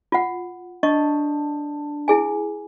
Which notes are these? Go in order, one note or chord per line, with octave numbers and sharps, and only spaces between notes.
F4 F#5
D4 D#5 C#6
E4 G#4 G#5